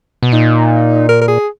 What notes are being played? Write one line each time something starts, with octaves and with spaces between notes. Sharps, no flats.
B2
A#2 D#4
A#4
A#4
G#4